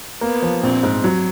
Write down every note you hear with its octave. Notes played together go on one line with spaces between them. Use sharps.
A#3 B3
F3
A#1 C4
G#2
F#3